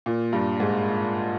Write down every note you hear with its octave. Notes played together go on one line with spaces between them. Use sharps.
A#2
G2
G#2